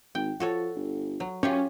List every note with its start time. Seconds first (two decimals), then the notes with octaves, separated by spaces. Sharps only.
0.15 G#1 G5
0.40 F3 F#4 A4 C#5
0.76 G1
1.20 F#3
1.43 F#2 C#4 F4 G4 C#5